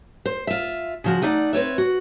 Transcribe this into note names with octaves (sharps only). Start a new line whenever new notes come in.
C5
F4 E5
C#3 F3 F#4
A3 D#4 D5 E5 F#5
C4 B4 C#5 E5
F#4